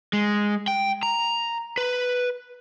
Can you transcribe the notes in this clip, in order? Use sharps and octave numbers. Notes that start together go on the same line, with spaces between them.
G#3
G5
A#5
B4